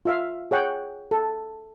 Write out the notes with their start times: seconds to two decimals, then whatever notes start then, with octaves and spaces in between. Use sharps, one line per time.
0.05 F4 E5 F5
0.51 G#4 C#5 F#5 G5
1.11 A4